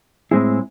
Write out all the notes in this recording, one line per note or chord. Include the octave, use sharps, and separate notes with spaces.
A2 G#3 C4 E4 G#4